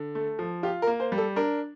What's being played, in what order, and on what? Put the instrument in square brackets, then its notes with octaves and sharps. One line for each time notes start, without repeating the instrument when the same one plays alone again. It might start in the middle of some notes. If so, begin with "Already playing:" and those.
Already playing: [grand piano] D3
A3
F3
[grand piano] F4 [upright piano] G4
[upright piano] A#4
[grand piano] A#3
[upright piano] C5
[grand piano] G3
[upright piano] A4
[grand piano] D4 [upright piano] A#4